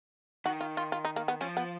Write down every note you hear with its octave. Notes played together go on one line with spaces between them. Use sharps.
D#3 F#4
F4
F4
F4
D#4
A#3
B3
F3 C#4
B3